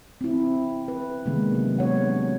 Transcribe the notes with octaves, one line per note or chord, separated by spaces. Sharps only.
C4 E4
B4
C3 D#3 G#3 A#3 B3 D4
F#3
B3 D4 C#5 F#5